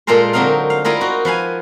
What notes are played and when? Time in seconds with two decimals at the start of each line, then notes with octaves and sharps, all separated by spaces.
0.07 A#2 G#3 F4 A4 A#4 C5
0.33 D3 F#3 C4 D#4 A#4 F5
0.70 F5
0.85 G3 E4 F4 A#4 D#5
1.01 D#4 F#4
1.25 F3 B4 F5 G#5